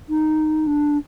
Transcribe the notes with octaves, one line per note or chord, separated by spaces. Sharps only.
D#4
D4